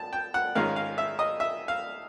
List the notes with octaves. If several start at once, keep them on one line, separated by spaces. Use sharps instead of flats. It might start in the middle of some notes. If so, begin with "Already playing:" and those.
Already playing: A5
G5
F#5
G#2 D#3 G#3 C#4 F4 F5
F5
E5
D#5
E5
F5